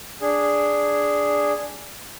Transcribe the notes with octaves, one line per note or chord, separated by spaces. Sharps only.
D4 G#4